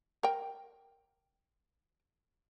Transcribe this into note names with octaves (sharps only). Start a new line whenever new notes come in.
A#4 G5